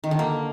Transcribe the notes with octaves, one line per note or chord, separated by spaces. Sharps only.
D#3
D3
A#3